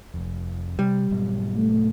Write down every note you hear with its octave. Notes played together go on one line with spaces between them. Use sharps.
F1 F2
C3 G3
G#2 B2 F#3
A3